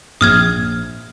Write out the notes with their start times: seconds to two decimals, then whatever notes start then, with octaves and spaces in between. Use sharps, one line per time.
0.21 A#1 D#6 F6 G#6